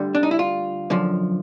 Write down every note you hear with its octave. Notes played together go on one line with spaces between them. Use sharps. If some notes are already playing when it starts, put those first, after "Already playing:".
Already playing: D2 D3 G3
D4
D#4
E4
F4
F#2 D3 F3